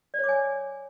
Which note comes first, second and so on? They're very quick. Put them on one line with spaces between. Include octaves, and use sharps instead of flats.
D5 C#5 D6 G#5